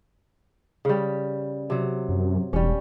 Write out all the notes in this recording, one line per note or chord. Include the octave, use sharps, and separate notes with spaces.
C#3 G3
C3 F#3
F#2
E1 G3 C#4